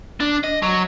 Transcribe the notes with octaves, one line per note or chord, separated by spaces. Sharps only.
D4
D#5
F#3